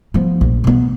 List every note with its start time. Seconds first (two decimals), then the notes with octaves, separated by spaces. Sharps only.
0.14 F3 B3
0.41 A#1
0.64 B2 B3